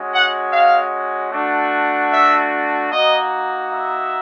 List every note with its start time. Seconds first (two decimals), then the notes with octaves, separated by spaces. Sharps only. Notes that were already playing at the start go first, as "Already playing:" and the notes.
Already playing: G#3 C#4 F#4
0.12 F#5
0.51 F5
1.31 A3 D4 F#4
2.11 E5
2.91 A#3 D#4 F#4 D#5
3.71 E5